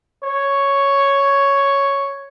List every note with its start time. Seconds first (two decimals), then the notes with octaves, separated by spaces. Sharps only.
0.24 C#5